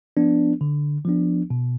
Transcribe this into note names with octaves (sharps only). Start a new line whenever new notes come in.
F3 B3 D4
D3
F3 B3 D4
B2